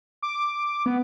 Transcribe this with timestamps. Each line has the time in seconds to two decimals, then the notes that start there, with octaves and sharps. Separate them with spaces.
0.22 D6
0.86 B3